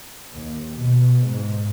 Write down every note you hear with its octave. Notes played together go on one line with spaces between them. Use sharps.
D#2
B2
G#2